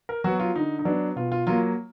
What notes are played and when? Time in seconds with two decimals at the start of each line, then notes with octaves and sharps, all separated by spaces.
0.09 A#4
0.24 F#3 B3 F#4
0.40 F4
0.55 D3 D#4
0.79 D#4
0.85 F#3 B3 D4
1.16 B2 F4
1.32 F4
1.47 F#3 A#3 F4